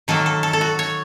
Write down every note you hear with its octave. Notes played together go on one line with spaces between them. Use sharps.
D#3 F#3 A#3 A4
A4
A4
A4
F#4
C#5